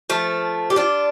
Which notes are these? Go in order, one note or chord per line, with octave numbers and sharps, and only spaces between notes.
F3 A3
G4
D4 F4